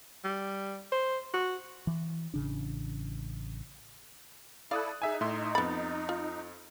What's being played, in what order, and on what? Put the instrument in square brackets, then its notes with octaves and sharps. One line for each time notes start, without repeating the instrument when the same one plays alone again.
[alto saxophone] G3
C5
F#4
[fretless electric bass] E3
A1 C#3 D4
[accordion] E4 A4 [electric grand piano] D5 D#6 F#6 [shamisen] F5
[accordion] D#4 [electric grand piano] G#4 E5 G#5
[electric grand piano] A2 E5 C6
[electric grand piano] F2 A6 [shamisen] B3 B5
[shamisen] F4